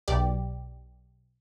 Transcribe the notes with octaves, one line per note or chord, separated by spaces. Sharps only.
B1 G4 D5